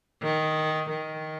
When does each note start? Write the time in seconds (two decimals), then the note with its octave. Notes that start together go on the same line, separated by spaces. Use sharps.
0.22 D#3
0.90 D#3